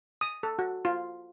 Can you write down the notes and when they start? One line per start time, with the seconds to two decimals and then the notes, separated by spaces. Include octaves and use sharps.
0.21 D#6
0.43 A4
0.59 F#4
0.85 F4